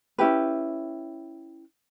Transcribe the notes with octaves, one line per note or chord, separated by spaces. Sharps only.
C#4 E4 G4 B4